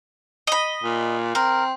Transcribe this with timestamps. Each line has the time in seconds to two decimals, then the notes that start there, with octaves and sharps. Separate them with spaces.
0.47 D#5 B5
0.83 A#2
1.35 C4 A#4